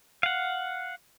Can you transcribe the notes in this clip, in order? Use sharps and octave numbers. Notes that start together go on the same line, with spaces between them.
F5 F#5